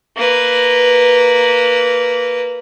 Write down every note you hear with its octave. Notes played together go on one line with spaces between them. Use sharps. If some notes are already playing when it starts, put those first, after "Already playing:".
A#3 B4